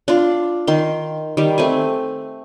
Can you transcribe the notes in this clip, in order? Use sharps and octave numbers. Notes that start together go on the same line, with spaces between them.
D4 F4
D#3 C6
D#3 G3
A3 C4 G#5